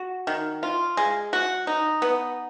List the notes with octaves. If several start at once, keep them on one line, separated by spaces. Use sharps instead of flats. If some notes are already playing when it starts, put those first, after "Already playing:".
Already playing: F#4
D#3
F4
G#3
F#4
D#4
B3